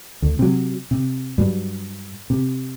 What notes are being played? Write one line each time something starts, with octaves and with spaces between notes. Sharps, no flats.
D2
C3 E3 F#3
C3
G2 F#3
C3